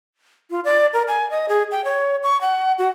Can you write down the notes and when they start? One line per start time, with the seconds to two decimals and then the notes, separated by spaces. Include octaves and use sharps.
0.51 F4
0.65 D5
0.93 A#4
1.08 G#5
1.31 D#5
1.49 G#4
1.71 G5
1.85 C#5
2.23 C#6
2.41 F#5
2.78 F#4